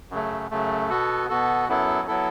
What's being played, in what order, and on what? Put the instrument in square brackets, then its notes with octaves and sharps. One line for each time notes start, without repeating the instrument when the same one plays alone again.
[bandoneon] F#2 C#3 A3
F#2 C#3 A3
B2 B3 F#4 A4
B2 B3 F#4 A4
F#2 F#3 B3 E4 A4
F#3 B3 E4 A4